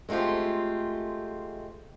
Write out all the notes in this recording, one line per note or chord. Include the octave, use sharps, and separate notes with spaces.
G#3 A3 C4 F4 G4